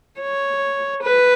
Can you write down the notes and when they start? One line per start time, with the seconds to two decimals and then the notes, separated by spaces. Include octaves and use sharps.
0.21 C#5
1.03 B4